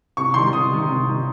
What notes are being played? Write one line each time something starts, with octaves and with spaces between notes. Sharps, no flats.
C3 C#6
D#3 G3 C6
C3 D#6
D#3 G3
C3
D#3 G3